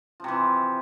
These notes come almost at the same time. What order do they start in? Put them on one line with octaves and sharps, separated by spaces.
F3 C3 E3